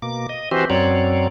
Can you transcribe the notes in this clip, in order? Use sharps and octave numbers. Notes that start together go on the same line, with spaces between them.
B2 A#3 D6
D#5
E3 C4 F#4 G4 C5
F#2 F#3 C4 C#5 D5